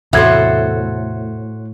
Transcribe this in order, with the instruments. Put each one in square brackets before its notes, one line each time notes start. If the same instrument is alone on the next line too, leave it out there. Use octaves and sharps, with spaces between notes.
[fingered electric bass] E2 C3 [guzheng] A2 [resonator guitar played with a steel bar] F#4 A4 C5 [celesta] E5 G#6